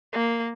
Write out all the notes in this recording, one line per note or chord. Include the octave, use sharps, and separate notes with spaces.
A#3